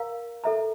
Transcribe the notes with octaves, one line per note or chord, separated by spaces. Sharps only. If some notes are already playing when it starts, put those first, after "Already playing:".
Already playing: A#4 F5 A#5
A4 E5 A#5